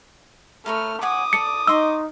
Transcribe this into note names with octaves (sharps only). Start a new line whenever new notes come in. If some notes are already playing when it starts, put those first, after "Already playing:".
A3 A#4 B4 C#5 F6
C#5 F#5 G#5 D6 D#6
A4 D5 C#7
D#4 D#5 C6 C#6 E6